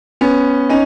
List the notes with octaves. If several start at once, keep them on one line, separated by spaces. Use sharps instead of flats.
B3 C#4
C#4 D#4